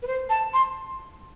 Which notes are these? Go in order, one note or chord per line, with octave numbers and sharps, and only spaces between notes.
B4
C5
A5
C6